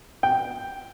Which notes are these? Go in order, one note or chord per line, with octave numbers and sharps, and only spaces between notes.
G5